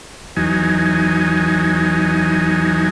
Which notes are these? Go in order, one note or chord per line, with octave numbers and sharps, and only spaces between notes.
E2 F#3 D#4 G#5